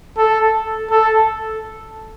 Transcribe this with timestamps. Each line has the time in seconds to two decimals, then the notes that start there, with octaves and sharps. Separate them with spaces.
0.18 A4
0.91 A4